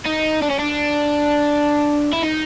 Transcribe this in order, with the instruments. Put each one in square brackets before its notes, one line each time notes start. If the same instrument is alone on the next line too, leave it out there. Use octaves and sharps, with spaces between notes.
[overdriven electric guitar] D#4
D4
C#4
D4
E4
D#4